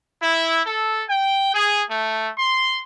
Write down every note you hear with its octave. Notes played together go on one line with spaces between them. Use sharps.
E4
A4
G5
G#4
A3
C6